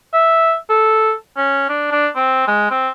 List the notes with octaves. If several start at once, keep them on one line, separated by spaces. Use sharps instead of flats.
E5
A4
C#4
D4
D4
C4
G#3
C4